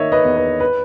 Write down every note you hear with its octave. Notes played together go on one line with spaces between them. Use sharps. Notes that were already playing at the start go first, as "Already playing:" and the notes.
Already playing: D#3 A#3 C#5 D#5 E5
B4 D#5
E2
B4
B4